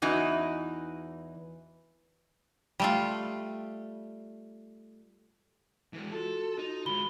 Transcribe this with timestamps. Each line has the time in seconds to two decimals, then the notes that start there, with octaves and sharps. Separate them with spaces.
0.02 E2 E3 D#4 F#4
2.80 G3 A3 F4
5.93 E3 G#3
6.12 F4 F#4 A4 C6
6.58 D#4
6.86 D#3 G#3 B5 G7